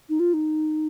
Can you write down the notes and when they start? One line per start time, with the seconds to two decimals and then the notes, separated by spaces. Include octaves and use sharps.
0.09 D#4
0.20 F4
0.34 D#4